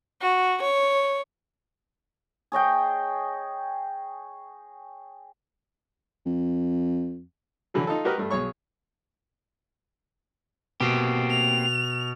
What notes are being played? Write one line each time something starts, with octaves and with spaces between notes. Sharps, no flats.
F#4
C#5
G#4 C#5 D#5 G5
F2
D3 E3 F#3
D#4 F4 A4
F#4 G4 A#4 B4 D#5
G2 A3
B1 G#4 C#5 C#6
B2 A#3 C4 G4
F7